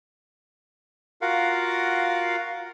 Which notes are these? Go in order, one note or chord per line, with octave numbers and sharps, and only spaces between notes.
F4 F#4 A#4 F5 F#5